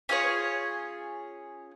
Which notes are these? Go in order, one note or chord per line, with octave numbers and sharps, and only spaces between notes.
C#4 F4 G#4 C#5